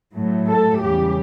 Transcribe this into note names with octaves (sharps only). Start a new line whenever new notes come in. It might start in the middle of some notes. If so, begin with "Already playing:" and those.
A2 F#3 A3
A4
E2 C#3 G3 G4